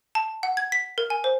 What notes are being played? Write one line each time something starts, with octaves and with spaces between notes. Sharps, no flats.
A5
F#5
G#6
B6
A#4
G#5
C5